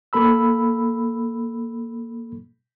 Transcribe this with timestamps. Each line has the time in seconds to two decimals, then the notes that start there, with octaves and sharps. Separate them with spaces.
0.13 A#3 A4 B5 E6